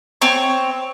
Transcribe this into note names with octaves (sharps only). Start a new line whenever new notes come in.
C4 C#5